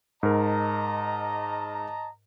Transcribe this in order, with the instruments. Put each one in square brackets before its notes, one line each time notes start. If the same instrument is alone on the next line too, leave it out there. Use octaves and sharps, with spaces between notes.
[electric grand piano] G#2 A#4 [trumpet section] D#5 A5 A#5